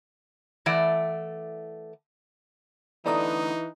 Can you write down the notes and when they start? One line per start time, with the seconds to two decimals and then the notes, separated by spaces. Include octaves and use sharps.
0.66 E3 A3 D5 F#5
3.06 D3 E3 A3 B3 D#4 D5 A#5 D#6